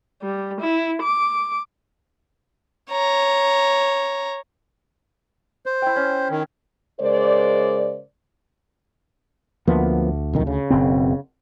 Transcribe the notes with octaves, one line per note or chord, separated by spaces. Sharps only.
G3
E4
D6
C#5 A#5
C5
E4 G5
C#4
D#3
C#3 G#3 A#4 C5 D5
D2 F3 A#3 B3
B1 F2 D#3
C#3
F#1 B2 C4